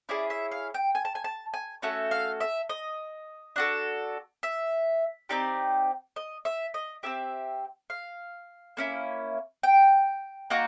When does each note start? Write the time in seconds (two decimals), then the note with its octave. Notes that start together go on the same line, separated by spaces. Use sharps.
0.09 C#4 E4 G#4 D5
0.30 E5
0.51 F5
0.74 G5
0.95 G#5
1.05 A5
1.15 G#5
1.24 A5
1.54 G#5
1.82 A3 C#4 F#4 A4
2.11 F5
2.40 E5
2.69 D#5
3.56 D4 F#4 A4
4.43 E5
5.29 C4 D#4 G4 D5
6.16 D#5
6.45 E5
6.74 D#5
7.03 C4 E4 G4 E5
7.90 F5
8.77 A#3 C#4 E4
9.63 G5
10.50 A#3 D#4 F#4